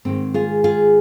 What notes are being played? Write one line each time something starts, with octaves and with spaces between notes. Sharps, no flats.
G#2 D#3 G#3 C4
F4 G#4
F4 G#4